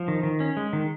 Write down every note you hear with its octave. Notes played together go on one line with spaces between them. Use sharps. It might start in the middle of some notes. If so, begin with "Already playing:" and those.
Already playing: F3
D#3
D#3
C#4
G#3
D#3